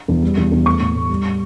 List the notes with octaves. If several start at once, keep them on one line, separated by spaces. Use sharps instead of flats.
E2
G3
E2
E2
A3 C#6
A2
A2
G3